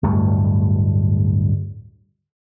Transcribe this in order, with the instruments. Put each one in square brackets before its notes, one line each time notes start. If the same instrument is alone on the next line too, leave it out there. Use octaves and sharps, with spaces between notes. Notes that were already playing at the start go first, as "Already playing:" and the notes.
[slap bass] D1 G2 A3